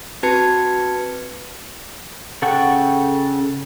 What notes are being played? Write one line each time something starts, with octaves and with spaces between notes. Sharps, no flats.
C4 F#4 B4 A5 G#6 C#7
C#3 A4 F#5 G5 C#6